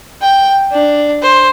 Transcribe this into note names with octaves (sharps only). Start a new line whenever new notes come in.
G5
D4
C5